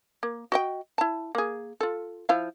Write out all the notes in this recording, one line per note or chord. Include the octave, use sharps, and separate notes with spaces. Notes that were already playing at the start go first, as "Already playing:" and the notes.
A#3
F#4 D#5 G5
E4 A5
A#3 G#4
F4 A4
F3 E4 F5